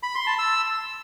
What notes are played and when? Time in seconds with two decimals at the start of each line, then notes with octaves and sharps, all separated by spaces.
0.03 B5
0.15 C6
0.27 A5
0.39 E6